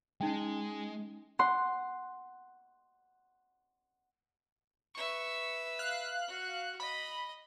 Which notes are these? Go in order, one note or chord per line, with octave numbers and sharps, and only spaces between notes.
G#3 C#4 D#4 G5
F#5 C6
B4 E5 C#6
F5 F#6
F#4
D#5 B5